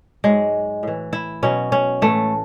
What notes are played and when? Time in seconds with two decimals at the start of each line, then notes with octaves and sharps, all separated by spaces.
0.24 G#2 F#3 G#3
0.83 A2 E3
1.13 E4
1.43 B2 F#3 C#4
1.72 C#4
2.02 A2 E3 A3